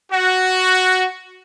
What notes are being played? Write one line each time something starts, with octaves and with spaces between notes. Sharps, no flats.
F#4